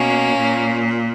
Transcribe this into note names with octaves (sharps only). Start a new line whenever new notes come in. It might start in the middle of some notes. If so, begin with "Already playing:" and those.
Already playing: B2 A#3 C#4
A#2